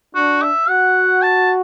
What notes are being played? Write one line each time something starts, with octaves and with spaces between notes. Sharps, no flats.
D4 F#4
E5
F#4 F#5
A5